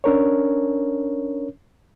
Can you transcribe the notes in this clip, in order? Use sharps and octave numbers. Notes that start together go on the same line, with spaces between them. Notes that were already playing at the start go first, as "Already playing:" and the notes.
C#4 D4 A#4 C#5